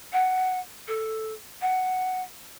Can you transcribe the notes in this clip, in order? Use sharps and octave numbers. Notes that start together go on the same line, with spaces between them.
F#5
A4
F#5